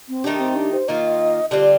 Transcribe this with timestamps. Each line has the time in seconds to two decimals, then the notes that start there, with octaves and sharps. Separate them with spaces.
0.09 C4
0.24 D#3 A3 D4 D#4 G4
0.40 C4
0.56 D4
0.73 C5
0.88 D#3 A#3 F4 D#5
1.51 D3 G3 C4 F4 D5